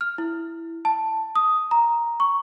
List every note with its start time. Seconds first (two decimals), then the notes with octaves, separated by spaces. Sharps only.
0.01 F6
0.18 E4
0.85 A5
1.35 D#6
1.71 A#5
2.20 C#6